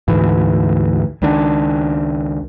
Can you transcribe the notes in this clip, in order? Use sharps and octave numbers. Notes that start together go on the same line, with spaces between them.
D2 G#2 E3
C#2 D#3 D4